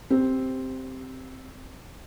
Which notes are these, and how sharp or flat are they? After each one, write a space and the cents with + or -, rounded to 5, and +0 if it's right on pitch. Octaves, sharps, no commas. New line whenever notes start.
C4 +0 G4 +0